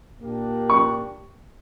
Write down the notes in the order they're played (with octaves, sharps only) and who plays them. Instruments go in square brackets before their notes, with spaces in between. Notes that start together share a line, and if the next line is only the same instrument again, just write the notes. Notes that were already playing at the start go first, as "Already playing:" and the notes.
[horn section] A#2 A#3 D4 G4
[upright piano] C#6